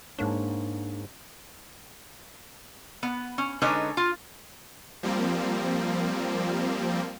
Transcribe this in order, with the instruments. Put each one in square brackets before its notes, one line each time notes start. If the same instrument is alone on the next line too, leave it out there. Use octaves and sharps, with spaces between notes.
[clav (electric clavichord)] G#2 A#3 C#5 [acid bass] D4
[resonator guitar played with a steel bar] B3
C#4
D3 G#3 C#4 D#4 B4 C#5
F4
[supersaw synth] F3 G3 A#3 C4